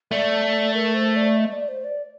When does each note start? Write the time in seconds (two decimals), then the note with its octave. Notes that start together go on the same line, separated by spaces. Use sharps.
0.11 A3 D5
0.74 A#4
0.95 C5
1.16 D5
1.37 D#5
1.52 D5
1.68 C5
1.84 D5